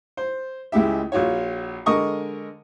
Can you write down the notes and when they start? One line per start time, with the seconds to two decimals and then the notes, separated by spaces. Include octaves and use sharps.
0.17 C5
0.72 C#2 G#3 E4 G4 E5
1.12 A#1 F4 F#4 C#5
1.86 D3 G#3 A#4 D#5 C#6 D#6